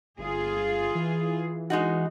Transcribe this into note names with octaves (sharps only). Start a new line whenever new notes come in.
G1 F4 G#4
E3
G#3 D#4 F#4